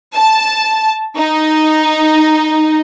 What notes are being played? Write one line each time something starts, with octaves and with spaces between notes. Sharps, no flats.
A5
D#4